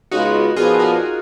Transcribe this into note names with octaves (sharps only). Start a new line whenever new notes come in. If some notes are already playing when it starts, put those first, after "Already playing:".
C#3 G#3 B3 D#4 F4 F#4
A#2 F3 B3 F4 G#4
F#4 A#4